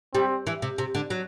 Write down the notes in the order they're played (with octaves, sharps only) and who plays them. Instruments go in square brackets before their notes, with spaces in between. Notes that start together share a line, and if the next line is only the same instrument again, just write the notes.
[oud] G3 [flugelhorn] C4
[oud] E3
C3
C3
D3
F#3